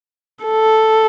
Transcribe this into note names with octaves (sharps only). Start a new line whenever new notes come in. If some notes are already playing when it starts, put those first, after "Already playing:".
A4